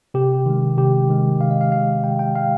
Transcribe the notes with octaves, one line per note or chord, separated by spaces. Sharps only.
C3 G4
D#3 G#3
C3 G4
D#3 G#3
C3 F5
D#5
F5
D#3 G#3 F5
C3 G5
G5
D#3 G#3 F5